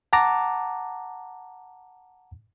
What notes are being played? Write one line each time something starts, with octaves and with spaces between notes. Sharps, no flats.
F#5 A5 A#5 D6